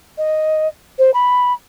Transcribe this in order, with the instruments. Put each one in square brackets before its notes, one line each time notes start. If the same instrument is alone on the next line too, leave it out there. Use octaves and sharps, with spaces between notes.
[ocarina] D#5
C5
B5